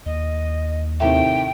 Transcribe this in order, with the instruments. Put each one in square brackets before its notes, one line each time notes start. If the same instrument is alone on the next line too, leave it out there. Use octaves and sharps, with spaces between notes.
[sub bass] D#2 [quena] D#5
[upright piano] A2 C3 D#3 [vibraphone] E5 [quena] G5